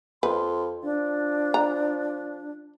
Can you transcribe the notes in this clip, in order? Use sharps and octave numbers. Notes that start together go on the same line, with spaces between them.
F2 B4 C6
F3 D4
A#5